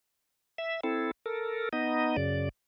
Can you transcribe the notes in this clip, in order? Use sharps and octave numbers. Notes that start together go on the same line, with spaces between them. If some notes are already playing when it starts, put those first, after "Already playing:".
E5
C4 E4 A4
A4 A#4
B3 D#4 D#5
F#2 C#3 D5